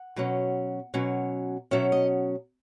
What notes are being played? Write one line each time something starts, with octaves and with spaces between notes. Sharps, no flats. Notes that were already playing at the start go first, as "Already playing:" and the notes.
Already playing: F#5
B2 F#3 C#4
B2 F#3 C#4
B2 F#3 C#4 E5
D#5